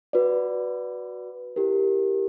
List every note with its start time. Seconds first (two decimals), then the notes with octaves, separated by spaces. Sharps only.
0.13 F#4 B4 D5
1.56 E4 G4 A#4